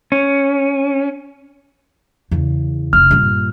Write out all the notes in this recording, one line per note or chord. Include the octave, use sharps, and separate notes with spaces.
C#4
E2 C#3
F1 C#3 F6
G2 A#2